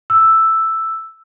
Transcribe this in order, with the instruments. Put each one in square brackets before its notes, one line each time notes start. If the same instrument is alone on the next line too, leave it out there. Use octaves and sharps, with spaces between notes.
[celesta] E6